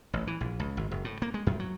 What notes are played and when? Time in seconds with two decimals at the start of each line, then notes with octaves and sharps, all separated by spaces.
0.13 A1
0.27 E3
0.41 A#1
0.60 C#2
0.77 G#1
0.91 F#1
1.05 A2
1.22 A#3
1.34 G#3
1.47 F#2
1.60 F#3